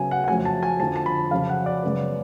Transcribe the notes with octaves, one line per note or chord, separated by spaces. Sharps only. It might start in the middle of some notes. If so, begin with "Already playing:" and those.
Already playing: C#3 F#3 B3 G#5
F#5
F#5
F2 C#3 F#3 A3 G#5
A5
G#5
F2 D3 F3 A5
A5
B5
F2 C#3 F#3 C#4 F5
F#5
D5
F#2 C#3 G#3 B3